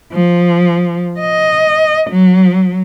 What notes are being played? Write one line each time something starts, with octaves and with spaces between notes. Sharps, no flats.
F3
D#5
F#3